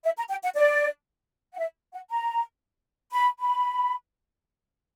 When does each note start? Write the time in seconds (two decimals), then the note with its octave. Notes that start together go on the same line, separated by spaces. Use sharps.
0.04 E5
0.17 A#5
0.30 G5
0.43 F#5
0.56 D5
1.53 F#5
1.58 E5
1.92 F#5
2.10 A#5
3.12 B5
3.39 B5